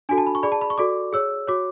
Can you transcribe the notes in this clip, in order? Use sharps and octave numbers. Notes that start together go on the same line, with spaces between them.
D4 F#4 A4 G#5
A5
B5
C#6
G#4 D5 B5
A5
B5
C#6
F#4 A4 D5 D6
G#4 C#5 E6
F#4 C#5 D6